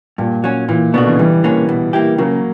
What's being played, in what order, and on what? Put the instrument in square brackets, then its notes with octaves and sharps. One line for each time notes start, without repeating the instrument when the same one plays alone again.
[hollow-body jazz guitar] G2 [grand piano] A#2
[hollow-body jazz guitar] F#3 C#4
[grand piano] A#2 [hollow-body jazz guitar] E3
[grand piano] B2 D3 [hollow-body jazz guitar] B3 D4 F#4
[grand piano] C#3 E3
[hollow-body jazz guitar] E2 [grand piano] E3 G3
[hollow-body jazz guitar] D3 A#3 C#4
B2
A#3 E4 G4
[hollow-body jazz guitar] C#3 [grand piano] F#3 A#3